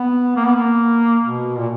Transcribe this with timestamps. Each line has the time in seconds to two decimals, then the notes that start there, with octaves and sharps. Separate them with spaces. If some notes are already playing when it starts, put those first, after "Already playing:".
Already playing: B3
0.36 A#3
0.46 B3
0.55 A#3
1.23 B2
1.58 A#2